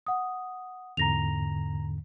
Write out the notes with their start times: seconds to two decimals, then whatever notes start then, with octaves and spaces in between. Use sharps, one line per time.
0.06 F#5 D#6
0.97 E2 G#2 D3 A#5 A#6 F7